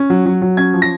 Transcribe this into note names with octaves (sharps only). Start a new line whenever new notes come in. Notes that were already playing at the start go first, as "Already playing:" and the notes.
Already playing: C#4
F#3
F#3
F#3
C#4 G#6
F3
A#6